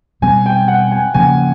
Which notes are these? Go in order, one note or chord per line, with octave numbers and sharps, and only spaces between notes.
B2 G3 C4 G#5
G5
F#5
G#5
C#3 F3 A#3 G#5